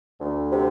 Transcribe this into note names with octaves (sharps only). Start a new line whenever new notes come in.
D2
C3